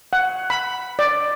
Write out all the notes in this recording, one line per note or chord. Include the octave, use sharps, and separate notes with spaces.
F#5
B5
D5